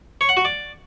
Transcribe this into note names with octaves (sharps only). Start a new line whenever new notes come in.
C#5
F#5
F#4
D5